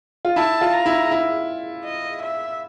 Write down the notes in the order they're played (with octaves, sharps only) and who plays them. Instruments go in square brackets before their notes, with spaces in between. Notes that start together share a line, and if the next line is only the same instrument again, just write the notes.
[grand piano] F4
[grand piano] E4 [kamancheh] A5
[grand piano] F4
[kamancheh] A#5
[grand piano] E4
E4
[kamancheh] D#5
E5